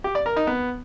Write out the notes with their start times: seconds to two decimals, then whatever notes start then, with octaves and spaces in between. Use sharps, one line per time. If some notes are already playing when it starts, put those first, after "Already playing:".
0.04 G4
0.15 D5
0.26 A#4
0.36 D#4
0.47 B3